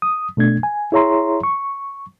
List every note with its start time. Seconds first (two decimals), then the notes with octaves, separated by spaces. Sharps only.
0.02 D#6
0.37 B2 A3 D4 G#6
0.63 G#5
0.92 E4 G#4 C#5 E5 A#5 C6
1.43 C#6